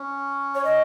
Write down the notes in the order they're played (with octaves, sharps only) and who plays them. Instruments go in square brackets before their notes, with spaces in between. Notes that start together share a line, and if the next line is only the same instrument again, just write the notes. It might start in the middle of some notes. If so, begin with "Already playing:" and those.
Already playing: [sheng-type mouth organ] C#4
[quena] C#5
D#5